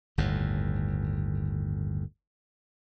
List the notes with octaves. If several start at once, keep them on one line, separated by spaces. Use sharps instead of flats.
G1 D#2 A2